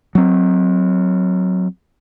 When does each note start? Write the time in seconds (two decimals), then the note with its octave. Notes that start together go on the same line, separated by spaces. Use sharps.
0.15 F#3 C4